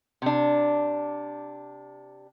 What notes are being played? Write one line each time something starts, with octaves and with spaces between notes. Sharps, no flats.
C3 D4